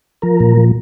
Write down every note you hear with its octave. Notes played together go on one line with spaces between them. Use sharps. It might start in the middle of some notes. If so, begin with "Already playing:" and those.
F3 A#4
A#2
F3